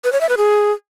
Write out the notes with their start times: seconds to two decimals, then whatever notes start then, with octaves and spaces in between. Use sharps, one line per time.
0.04 B4
0.13 C#5
0.21 E5
0.29 B4
0.37 G#4